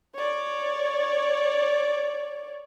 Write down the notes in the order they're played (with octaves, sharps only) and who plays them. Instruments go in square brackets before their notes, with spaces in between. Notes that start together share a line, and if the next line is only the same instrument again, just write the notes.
[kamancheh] C#5 D5